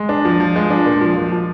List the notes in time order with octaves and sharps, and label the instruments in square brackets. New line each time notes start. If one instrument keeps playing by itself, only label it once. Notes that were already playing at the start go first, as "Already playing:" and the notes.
Already playing: [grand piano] G#3
D4
F3
F3
G#3
D4
A#2
F3
F3
F3